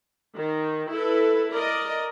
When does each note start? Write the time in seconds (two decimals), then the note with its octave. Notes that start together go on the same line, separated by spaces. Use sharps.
0.36 D#3
0.92 E4 A4 B4
1.51 A#4 D5 D#5